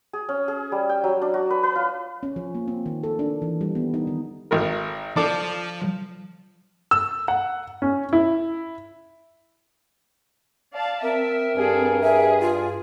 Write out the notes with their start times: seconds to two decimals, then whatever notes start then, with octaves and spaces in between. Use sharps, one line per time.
0.13 G#4
0.29 C#4
0.48 G#4
0.72 G3
0.89 G5
1.04 F#3
1.22 D4
1.34 F#4
1.50 B4
1.63 B4
1.76 F4
2.23 C#4
2.36 F3
2.55 A#3
2.68 C4
2.86 D#3
3.03 A4
3.19 D4
3.42 E3
3.61 G3
3.75 B3
3.94 D#4
4.07 D#3
4.51 G#1 A#4
5.16 F3 D4 A4 D6
6.91 E6
7.28 F#5
7.82 C#4
8.13 E4
10.75 D5 F5 A5
11.03 C4 A#4 E5
11.56 G2 G#4 A4
12.01 G#4 E5
12.41 F4